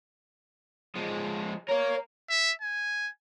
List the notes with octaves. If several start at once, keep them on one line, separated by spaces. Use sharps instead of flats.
F3 G#3
A#4 C#5 F5
E5
G#5